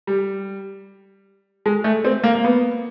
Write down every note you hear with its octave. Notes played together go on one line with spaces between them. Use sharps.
G3
G#3
A3
C4
A#3
A#3
B3